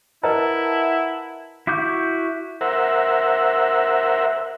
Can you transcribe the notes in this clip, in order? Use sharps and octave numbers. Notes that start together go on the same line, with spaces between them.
E4 A#4 B4 D#5 E5 F#5 A5 A#5
E4 F#4 D6 G6
A#4 C5 E5 F#5